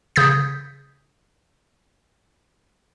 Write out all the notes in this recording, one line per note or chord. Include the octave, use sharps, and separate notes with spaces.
C#3 D#6 G6 G#6 B6